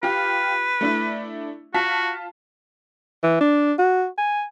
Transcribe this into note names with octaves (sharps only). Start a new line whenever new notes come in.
F4 G4 B4
A3 D4 E4
F4 F#4 A5 B6
E3
D4
F#4
G#5